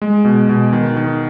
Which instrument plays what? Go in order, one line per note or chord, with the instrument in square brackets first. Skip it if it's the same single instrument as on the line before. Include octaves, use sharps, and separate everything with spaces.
[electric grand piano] G#3
B2
B2
D#3
D#3